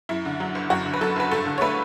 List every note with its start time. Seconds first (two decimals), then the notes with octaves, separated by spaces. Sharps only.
0.09 F#2 E4
0.25 D3
0.40 F#3
0.55 F#1
0.70 F#2 F#4
0.85 D3
0.94 B4
1.01 F#3 A4
1.16 F#1 B4
1.31 G2 A4
1.46 D3
1.58 C#5
1.61 A3 B4